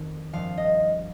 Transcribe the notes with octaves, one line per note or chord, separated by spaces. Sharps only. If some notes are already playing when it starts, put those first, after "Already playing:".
Already playing: F2 D#3
G2 F3 F5
D#5